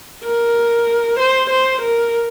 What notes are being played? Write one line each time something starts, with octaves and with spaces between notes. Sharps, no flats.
A#4
C5
C5
A#4